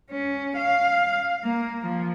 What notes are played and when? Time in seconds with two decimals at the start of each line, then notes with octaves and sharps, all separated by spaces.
0.11 C#4
0.57 F5
1.43 A#3
1.83 F3